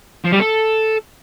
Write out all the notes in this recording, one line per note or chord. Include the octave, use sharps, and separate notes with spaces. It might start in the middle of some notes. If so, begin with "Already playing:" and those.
F3
G3
A4